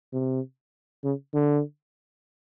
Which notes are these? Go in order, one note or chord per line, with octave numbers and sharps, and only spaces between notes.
C3
C#3
D3